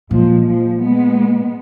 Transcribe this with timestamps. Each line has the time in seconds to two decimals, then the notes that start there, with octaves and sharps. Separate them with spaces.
0.11 A#2 F3 G#3
0.46 F3 G#3
0.81 G#3 B3